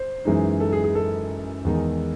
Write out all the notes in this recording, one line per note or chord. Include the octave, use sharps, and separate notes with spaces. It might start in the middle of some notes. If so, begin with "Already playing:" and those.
Already playing: C5
F#2 E3 G#3 D#4
A4
G#4
G#4
A4
E2 D#3 G#3 D#4